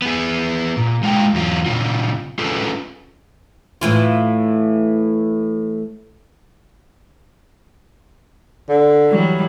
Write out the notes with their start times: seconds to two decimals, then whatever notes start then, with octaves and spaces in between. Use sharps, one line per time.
0.02 B3 G#4
0.77 A#2
1.03 G#3 A#3 F4 G5
1.34 E2 F#3 F4
1.66 A#2 C#3 F4
2.39 C#4 F4 G#4 A4 B4
3.81 A2 E3 F4
8.69 D3
9.08 E3 F#3 G3